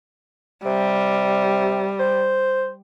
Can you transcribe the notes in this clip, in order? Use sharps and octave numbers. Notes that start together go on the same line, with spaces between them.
C3 G3
C5